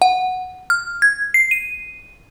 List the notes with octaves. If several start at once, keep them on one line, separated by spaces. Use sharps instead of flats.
F#5
F6
G#6
C7
D#7